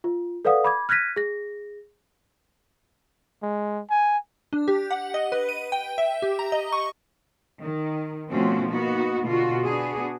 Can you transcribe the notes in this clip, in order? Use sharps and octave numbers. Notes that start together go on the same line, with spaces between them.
F4
A4 B4 D5 F5 F#5 D#6
B5 D6 G#6
F6 F#6 G#6 A#6 B6 D#7
G#4 A#6
G#3
G#5
D4
G4
F#5
D#5
B4
D#7
G5
E5
G4
A#5
D#5
C#6
D#3
B2 F3 A3 C4 C#4 F#4
A#3 B3 D#4 F#4
B2 D3 F4 F#4
B3 D4 F#4 G#4